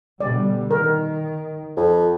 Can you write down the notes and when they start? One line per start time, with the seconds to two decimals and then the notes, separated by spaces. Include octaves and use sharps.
0.20 B2 D3 G3 D5
0.71 D#3 A#4
1.77 F2